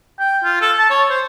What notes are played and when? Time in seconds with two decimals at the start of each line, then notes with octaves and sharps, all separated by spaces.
0.19 G5
0.44 F4
0.61 A4
0.78 A5
0.90 C#5
1.10 C5